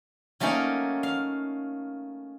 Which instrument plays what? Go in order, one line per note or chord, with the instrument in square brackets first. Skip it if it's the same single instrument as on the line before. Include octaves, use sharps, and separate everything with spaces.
[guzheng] F#3 A3 A#3 C#4 D#4
F5